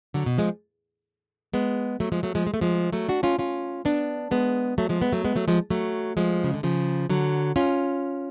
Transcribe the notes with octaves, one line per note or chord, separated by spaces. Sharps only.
D3 F#3
B2
F3 G#3
G#3 B3
F#3 A3
F3 G#3
F#3 A3
F3 G#3
G#3
A3
F3 G#3
F#3 A3
D4 F#4
C#4 F4
C#4 F4
B3 D4
G#3 B3
F#3 A3
F3 G#3
G#3 B3
F#3 A3
G#3 B3
F#3 A3
F3 G#3
F#3 A3
F3 G#3
C#3
D3
C#3 F3
D3 F#3
C#4 F4